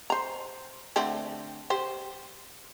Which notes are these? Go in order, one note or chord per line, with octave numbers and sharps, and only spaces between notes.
C5 A#5
D3 A3 C4
G4 C5